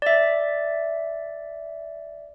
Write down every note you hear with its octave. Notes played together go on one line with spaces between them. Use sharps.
D5 E5